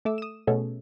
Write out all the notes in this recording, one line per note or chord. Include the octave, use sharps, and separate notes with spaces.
A3 D6 E6
D#6 E7
B2 A3 C#4 G#4 A4